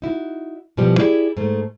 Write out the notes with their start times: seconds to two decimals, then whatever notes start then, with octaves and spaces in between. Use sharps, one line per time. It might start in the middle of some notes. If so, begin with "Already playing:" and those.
0.02 D#4 E4 F#4
0.77 B2 E3 F3 G3
0.98 E4 G4 G#4 D5
1.37 G#2 A3